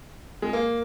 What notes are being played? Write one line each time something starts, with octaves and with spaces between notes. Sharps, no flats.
G#3
A#3